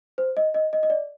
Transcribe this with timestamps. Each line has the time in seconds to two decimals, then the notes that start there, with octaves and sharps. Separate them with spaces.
0.18 C5
0.37 D#5
0.54 D#5
0.73 D#5
0.83 D#5
0.90 D5